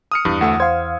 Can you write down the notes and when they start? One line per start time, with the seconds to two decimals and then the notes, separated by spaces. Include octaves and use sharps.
0.12 D#6 F6 C#7
0.25 E2 G2 E4
0.41 D2 A3 F#5 E6
0.60 C5 F5 G#6